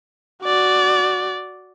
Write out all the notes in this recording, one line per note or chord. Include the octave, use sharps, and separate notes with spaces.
F#4 D5